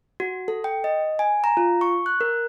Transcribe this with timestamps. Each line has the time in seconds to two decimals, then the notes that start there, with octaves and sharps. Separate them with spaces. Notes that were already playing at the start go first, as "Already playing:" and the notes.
0.20 F#4
0.48 A4
0.64 G5
0.84 D#5
1.19 G#5
1.44 A#5
1.57 F4
1.81 C#6
2.06 F#6
2.21 A#4